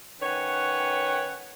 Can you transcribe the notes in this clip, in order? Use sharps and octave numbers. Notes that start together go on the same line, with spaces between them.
D#3 C#4 B4 C#5 F#5 G5